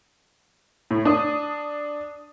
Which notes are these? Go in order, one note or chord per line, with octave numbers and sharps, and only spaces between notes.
A2
D4 D#6